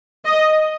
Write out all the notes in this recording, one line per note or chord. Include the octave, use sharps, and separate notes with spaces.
D#5